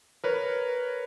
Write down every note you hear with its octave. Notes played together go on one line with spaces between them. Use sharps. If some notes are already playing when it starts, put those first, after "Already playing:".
A#4 B4 C#5